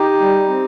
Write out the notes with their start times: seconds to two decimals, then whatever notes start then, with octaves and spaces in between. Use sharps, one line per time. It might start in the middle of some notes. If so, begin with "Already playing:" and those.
Already playing: D#4 G4
0.20 G3
0.48 C4